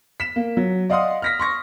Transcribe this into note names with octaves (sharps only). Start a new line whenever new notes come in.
B6 E7
A#3
F#3
D5 D#5 F5 F#5 C6 D#6
F6 A#6 B6
C6 C#6 A#6